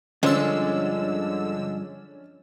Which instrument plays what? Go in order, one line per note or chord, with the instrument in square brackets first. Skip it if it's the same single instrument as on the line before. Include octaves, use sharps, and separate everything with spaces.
[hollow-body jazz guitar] G2 F3 C5 [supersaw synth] D3 E6 [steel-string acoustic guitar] G#3 [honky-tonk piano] C#4 D4